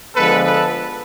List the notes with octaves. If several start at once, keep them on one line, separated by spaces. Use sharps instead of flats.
D3 F3 G#3 B3 A4 B4
A4 B4